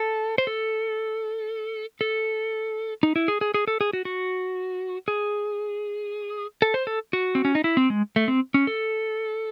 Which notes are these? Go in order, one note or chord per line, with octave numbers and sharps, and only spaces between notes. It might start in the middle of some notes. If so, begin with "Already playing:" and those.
Already playing: A4
C5
A4
A4
D#4
E4
G#4
G#4
G#4
A4
G#4
F#4
F#4
G#4
A4
C5
A4
F#4
C4
C#4
D#4
E4
C4
G#3
A3
C4
C#4
A4